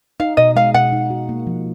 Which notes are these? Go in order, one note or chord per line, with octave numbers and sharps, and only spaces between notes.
D#4 F5
B2 D#5
G#3 F5
B2 F#5
D#4
F#4
A#3
F3